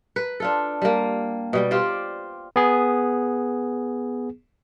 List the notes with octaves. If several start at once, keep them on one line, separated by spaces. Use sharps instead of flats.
B4
D4 F4 A4
G3 A#3
B2 G3 G5
F4 G4 C5 D5
B3 G#4